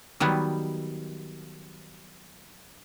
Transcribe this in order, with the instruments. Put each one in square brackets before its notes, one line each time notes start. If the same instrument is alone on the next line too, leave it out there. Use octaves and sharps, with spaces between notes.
[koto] D#3 F#3 G3 B3